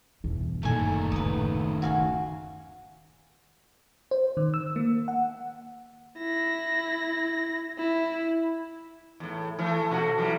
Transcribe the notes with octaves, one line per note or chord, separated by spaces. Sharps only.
E2 G2 B2
F#1 A#2 D#3 A3 A4 G#5
D1 C#3 B4 D#6
F#4 F5 G#5
E3
C5
D#3
E6
A#3
F#5
E4 A#6
E4
E2 A2
E3 A3
B2 F#4
E3 F#3 G3